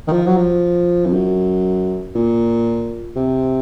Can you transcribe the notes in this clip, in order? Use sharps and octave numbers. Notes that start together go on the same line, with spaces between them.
D#3
F3
F#3
F3
F2
F#2
A#2
C3